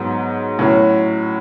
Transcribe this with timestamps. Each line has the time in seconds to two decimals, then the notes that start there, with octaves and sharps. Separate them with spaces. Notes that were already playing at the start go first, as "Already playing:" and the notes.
Already playing: G#2 F#3 B3 F#4
0.59 A2 F#3 C#4 F#4